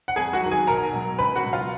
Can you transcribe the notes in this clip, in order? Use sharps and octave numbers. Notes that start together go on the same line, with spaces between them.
F#5
F2 G#4 G#5
F#4 F#5
D#3 F#3
G#4 G#5
B1 A#4 A#5
B2 F#3
C#2 B4 B5
F#4 F#5
B2 F#3
F4 F5